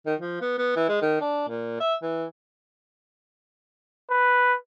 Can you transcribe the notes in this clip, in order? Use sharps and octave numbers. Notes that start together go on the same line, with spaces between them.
D#3
F3
B3
B3
E3
G#3
D#3
D4
A#2
E5
E3
B4